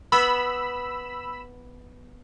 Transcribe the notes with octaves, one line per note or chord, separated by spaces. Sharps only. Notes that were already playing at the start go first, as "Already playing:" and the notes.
B3 B5 E6